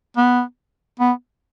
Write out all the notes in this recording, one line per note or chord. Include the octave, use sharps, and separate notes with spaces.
B3
B3